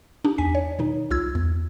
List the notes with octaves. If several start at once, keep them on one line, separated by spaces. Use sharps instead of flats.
D4 D#4 G4
E2 G#5 B6
C#5
B2 D#3 D#4
C2 F4 E6 G#6
E2